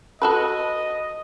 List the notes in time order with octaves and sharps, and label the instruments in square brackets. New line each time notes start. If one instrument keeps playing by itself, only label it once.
[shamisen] F#4 A4 B4 [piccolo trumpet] D#5